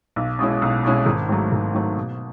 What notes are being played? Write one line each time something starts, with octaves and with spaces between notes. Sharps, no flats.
B1
B2 G#3 C#4 E4
B1
B2 G#3 C#4 E4
G#1
G#2 F#3 A3
G#1
G#2 F#3 A3
B2